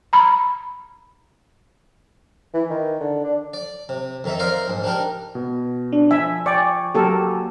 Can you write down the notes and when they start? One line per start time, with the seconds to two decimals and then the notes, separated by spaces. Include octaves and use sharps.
0.13 A#5 B5
2.54 E3
2.70 D#3
3.00 D3
3.24 D4
3.53 D5
3.89 C3
4.24 F2 D#3 D#4 E5
4.39 A#4 C5 D5 D#5 F5 A#5
4.68 A#1 G#2
4.84 D4 D#4 G4 A#4
5.35 B2
5.92 D4
6.11 F3 E5 G#5
6.46 D5 G5 G#5 C#6
6.95 F#3 A#3 G4 A4 A#4